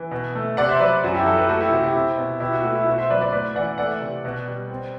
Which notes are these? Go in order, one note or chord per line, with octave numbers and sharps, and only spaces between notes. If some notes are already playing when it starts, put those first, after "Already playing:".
Already playing: E3
B2
A3
C3 D5 F#5
C5 E5
F#3 B4 D5
F#2 F#4
E4 G4
F#3 F#4 A4
G4 B4
A3 F#4 A4
E4 G4
C3 F#4
E4 G4
C4
B2
B2 E4 G4
F#4
A3 F#4
E4
B2 F#4
C5 E5
F#3 B4 D5
B4 D5
A2 B4 D5
E3 D5 F#5
A3 D5 F#5
C3
B2
G3
C4